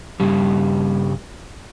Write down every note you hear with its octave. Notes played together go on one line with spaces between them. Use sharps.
G2 C#3 G3